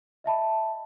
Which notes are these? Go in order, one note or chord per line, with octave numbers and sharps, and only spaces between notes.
D#5 E5 A5 B5